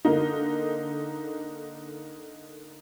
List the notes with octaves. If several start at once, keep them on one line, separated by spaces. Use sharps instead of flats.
D3 A#3 D#4